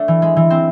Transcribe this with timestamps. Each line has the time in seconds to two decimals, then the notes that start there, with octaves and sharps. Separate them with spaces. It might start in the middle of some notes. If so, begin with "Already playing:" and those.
Already playing: A3 D4
0.08 E3
0.22 G#3
0.37 E3
0.50 C4